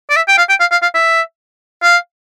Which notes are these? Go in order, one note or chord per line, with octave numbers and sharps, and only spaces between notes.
D5
E5
G5
F5
G5
F5
F5
F5
E5
F5